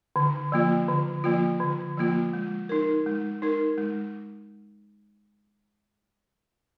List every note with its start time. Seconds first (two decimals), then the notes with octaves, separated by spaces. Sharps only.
0.16 D3
0.52 F3 A#3 F4
0.88 D3
1.24 F3 A#3 F4
1.60 D3
1.97 F3 A#3 F4
2.33 G#3
2.69 D#4 A#4
3.06 G#3
3.42 D#4 A#4
3.78 G#3